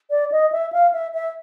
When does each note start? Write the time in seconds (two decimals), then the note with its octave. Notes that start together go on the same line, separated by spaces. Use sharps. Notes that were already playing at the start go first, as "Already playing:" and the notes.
0.10 D5
0.32 D#5
0.52 E5
0.72 F5
0.93 E5
1.14 E5